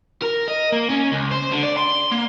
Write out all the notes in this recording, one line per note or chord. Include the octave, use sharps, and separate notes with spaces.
A#4
D#5
A#3
C#4
C#2
C5
D3
D5
C6
A#3